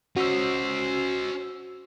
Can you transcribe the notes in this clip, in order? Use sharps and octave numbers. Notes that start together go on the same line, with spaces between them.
C#4 F#4 C5 D#5 E6